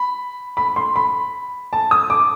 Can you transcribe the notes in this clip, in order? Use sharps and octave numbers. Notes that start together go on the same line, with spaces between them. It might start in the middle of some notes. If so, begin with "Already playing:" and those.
Already playing: B5
B5
C6
B5
A5
D#6
D6